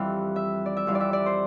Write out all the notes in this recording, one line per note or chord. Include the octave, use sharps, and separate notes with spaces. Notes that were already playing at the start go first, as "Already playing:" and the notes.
Already playing: F2 E3 G3 F5
E5
D5
E5
F2 E3 G3 F5
D5
E5
D5
C5